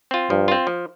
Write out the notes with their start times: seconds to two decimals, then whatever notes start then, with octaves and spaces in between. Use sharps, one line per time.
0.11 C4 F4
0.30 G2 F3
0.48 C4 F4
0.67 F3